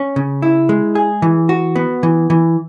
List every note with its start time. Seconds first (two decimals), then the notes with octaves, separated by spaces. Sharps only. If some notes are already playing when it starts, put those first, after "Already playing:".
Already playing: C#4
0.16 C#3
0.42 E4
0.69 G#3
0.95 G#4
1.22 E3
1.49 F#4
1.76 B3
2.03 E3
2.30 E3